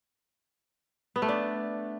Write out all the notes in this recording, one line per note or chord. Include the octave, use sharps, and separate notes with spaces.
B3
A3
D4